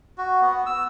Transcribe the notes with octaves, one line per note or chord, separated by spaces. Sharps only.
F#4
B3
E6